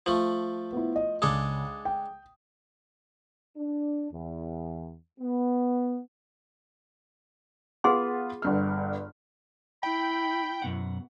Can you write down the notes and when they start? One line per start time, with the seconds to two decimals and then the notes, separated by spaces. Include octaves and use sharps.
0.06 F3 A3 F#7
0.73 B3 E4
0.96 D#5
1.22 C#2 G#3 D4 A4 D#6
1.85 G5
3.57 D4
4.12 E2
5.20 B3
7.84 B3 F4 G#4 F#5 C6
8.42 G1 G2 F6
9.83 E4 G5 B5
10.62 F#2 B2 F#5